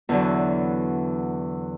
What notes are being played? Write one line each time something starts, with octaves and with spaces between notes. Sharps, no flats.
E2 D3 E3 F#3